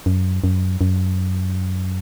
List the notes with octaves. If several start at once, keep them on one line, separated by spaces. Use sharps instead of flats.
F#2
F#2
F#2